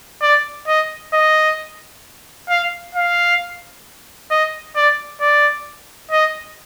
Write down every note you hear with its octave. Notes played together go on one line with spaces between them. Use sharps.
D5
D#5
D#5
F5
F5
D#5
D5
D5
D#5